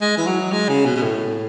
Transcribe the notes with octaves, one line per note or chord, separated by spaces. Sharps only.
G#3
E3
F#3
G#3
C#3
B2
B2
A2